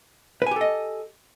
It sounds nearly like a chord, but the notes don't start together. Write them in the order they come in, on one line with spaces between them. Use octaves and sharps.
B4 G#5 G4 A4 D#5